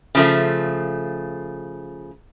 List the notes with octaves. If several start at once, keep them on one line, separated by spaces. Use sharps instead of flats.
C#3 F3 A3